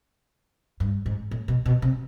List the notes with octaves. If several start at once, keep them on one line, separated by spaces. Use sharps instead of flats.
G2
G#2
A2
B2
B2
C3